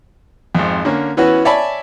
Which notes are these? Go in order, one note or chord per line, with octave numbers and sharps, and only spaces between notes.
G#1 F2
D3 A#3 C#4
E3 B3 C#4 F#4 B4
C#5 D5 E5 G#5 A5 B5